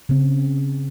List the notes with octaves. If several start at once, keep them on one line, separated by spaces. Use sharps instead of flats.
C#3 C4